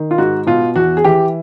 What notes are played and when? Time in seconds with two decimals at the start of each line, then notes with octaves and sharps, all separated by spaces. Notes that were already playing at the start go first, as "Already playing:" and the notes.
Already playing: D#3
0.11 F4
0.18 G#2 F#4
0.46 B2 F4
0.76 E2 F#4
0.97 G#4
1.04 E3 G4